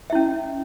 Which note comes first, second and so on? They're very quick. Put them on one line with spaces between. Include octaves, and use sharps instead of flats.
E5 E4 C#4